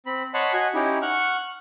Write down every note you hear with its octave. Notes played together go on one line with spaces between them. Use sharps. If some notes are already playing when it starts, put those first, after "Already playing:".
C4 B5
C#5 D#5 F#5 A5 B5 C6
F#4 D#5 G#5
C#4 D#4 E4 G4
F#5 C#6 F6